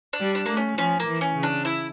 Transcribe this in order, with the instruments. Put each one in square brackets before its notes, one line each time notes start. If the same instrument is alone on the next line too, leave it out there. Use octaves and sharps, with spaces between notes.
[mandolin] D4
[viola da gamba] G3
[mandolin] D4
[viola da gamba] A3 [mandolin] A#3
[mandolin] C#4
[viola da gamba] F3 [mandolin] C#4
[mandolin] A#3
[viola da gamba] E3
[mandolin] C#4
[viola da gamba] C#3
[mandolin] D4
E4